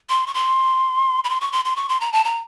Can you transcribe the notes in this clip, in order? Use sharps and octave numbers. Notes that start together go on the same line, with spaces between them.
C6
C#6
C6
B5
C6
C#6
C6
C6
C#6
C6
A#5
A5
A#5